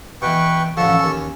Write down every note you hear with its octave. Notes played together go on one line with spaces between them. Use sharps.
B2 E3 B4 G5 C#6
A1 D3 F3 A4 C#6 E6
D#2 C#4